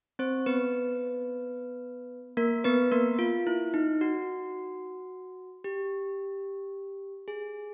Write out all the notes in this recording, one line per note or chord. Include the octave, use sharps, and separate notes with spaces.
C4 C5
B3 B4
A#3 A#4
B3 B4
A#3 A#4
F4
E4
D#4
F#4
G4
G#4